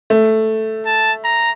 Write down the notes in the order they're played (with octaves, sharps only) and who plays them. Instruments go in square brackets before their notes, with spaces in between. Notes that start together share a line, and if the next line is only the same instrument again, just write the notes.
[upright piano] A3
[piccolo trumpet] A5
A#5